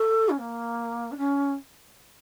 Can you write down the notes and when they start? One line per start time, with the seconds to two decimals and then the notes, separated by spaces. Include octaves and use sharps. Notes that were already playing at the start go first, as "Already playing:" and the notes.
Already playing: A4
0.29 C#4
0.39 A#3
1.11 D4
1.17 C#4